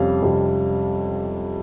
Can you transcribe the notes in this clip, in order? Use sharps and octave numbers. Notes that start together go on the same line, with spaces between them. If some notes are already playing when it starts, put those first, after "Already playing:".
Already playing: F2 C3 G3 C#4 F5
F2 C3 G3 C#4